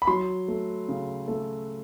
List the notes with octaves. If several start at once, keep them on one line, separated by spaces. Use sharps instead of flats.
B5
F#3 C6
A3
C#3
A3